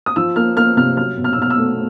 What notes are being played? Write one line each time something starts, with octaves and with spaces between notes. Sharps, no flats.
D#6
F3 E6
A#3 F6
A#3 F6
C3 F6
F#3 F6
B2
F6
E6
B2 F6
E6
A3